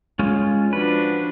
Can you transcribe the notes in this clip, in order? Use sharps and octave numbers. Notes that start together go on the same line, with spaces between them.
G#3 C#4 F4
F3 D4 F#4 B4